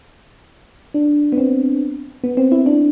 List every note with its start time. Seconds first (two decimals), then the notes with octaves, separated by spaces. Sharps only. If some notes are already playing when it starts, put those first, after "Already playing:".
0.94 D4
1.32 B3
1.38 C4
2.24 B3
2.37 C4
2.52 E4
2.66 D4